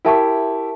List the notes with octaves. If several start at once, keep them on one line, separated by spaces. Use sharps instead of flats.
E4 G4 A#4 E5 A5 C#6